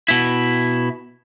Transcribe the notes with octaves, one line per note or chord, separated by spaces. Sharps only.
B2 E4